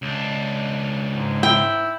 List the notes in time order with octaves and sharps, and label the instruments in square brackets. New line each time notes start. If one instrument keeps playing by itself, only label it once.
[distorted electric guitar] C#2 D4
[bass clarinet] G#2
[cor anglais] E4 [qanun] G5